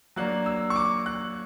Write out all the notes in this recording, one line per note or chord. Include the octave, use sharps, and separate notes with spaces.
F#3 A#3 D4 F#6
E6
C#6
D6
F#6